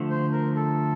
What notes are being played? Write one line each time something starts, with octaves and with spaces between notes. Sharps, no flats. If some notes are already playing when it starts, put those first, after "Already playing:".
Already playing: D3 F3 A3
C5
A#4
A4